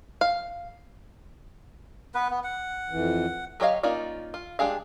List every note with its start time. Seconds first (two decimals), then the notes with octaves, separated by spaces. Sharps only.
0.21 F5
2.15 B3 B4
2.30 B3
2.44 F#5
2.90 F2 E3
3.60 F#3 G4 C#5 D#5 F5
3.83 A#3 C#4 D#4 F4 D5
4.34 F4
4.59 G#3 D4 G4 G#4 F5